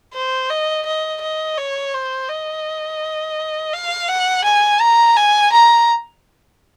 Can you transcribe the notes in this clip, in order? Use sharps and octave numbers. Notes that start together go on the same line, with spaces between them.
C5
D#5
D#5
D#5
C#5
C5
D#5
F5
F#5
G#5
A#5
G#5
A#5